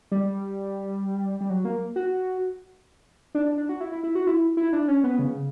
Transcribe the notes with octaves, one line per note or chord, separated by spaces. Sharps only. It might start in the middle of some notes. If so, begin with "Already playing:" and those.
G3
G3
F#3
A#3
F#4
D4
D4
D4
F#4
E4
E4
E4
F#4
E4
E4
D4
C#4
B3
C#3